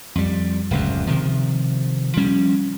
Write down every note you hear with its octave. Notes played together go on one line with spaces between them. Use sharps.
F2 G3
D1 C#2 F#2
C3 D#3 F3
F3 G3 C#4